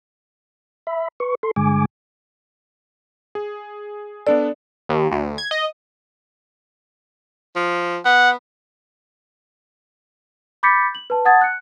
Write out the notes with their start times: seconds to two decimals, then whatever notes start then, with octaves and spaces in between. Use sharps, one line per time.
0.87 E5 B5
1.20 B4 C#6
1.43 A4 C6
1.56 G2 D3 G#3 G#5 D6
3.35 G#4
4.27 B3 D4 A4 D5
4.89 D#2
5.12 D2
5.38 G#6
5.51 D#5
7.56 F3
8.05 B3 F#5
10.63 B5 D6 G6 A6 B6 C#7
10.95 F#7
11.10 B4 A5
11.25 F#5 A5 D#6 G#6 A6
11.41 F#6 C#7